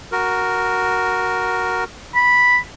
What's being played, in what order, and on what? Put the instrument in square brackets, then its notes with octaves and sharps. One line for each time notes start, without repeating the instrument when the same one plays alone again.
[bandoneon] F#4 A#4
[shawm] B5